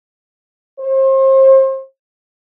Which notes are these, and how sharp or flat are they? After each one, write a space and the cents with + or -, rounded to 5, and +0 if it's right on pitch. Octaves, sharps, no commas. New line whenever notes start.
C5 +35